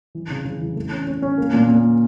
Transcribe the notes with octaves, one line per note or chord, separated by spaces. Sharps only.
E3
C#3
C#3
E3
A3
C#4
C#4
C#4
A#3
A#2
A#2